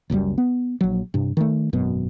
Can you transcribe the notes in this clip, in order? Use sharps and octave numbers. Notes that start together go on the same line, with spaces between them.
F#1 C#2 F#2 G3
B3
A#1 F#3
G2 C3
D#3 F#3 A3
G#1 F#2 B2